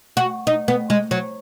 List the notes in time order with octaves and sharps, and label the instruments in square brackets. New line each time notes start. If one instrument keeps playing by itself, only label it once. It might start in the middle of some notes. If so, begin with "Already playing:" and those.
[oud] F#4
D#4
B3
G#3
F#3